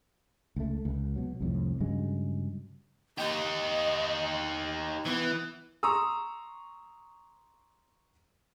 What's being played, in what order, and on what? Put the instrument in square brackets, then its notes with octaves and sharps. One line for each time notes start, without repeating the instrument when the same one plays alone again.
[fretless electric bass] C#2 A3
C#2
B2 F#3
C2 F2 A2
G2 C#3 F#3 G#3
[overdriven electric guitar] D#4 G4 [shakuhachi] D#5
[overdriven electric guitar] E3 [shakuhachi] B3
[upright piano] A#5 C6 C#6 D#6 E6